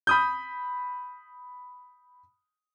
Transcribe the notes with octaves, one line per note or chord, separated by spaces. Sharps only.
B5 D#6 G6